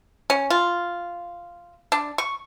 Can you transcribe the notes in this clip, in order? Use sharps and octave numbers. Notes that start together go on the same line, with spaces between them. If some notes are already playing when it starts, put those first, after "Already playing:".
C#4
F4
D4
C#6